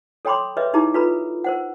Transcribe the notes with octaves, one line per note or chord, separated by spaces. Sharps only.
A4 C#5 G5 B5 C6 D6
G#4 B4 C#5 D#5 E5
D#4 E4 G4 G#4 A#5 D6
F4 A4 B4 A#5 B5
A#4 C5 F#5